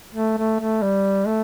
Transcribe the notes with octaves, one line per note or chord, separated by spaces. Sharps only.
A3
A3
A3
G3
A3